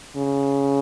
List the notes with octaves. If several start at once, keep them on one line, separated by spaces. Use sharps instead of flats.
C#3